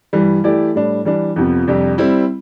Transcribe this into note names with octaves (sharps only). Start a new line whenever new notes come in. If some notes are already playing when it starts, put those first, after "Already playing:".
G2 E3 G3
E3 A3 E4 G4 D5
A2 G3 D4
E3 G3 D4
F2 C3 F3 B3
F2 C3 G3 D4 G4
G3 C4 E4